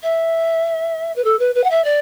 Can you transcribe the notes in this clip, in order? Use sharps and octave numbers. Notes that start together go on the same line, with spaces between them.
E5
B4
A4
B4
B4
F#5
E5
D5